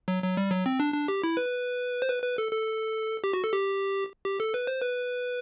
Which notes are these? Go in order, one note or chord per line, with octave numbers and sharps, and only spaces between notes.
F#3
F#3
G3
F#3
C4
D4
D4
G4
E4
B4
C5
B4
B4
A4
A4
G4
F#4
A4
G4
G4
A4
B4
C5
B4